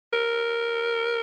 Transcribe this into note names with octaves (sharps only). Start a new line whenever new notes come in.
A#4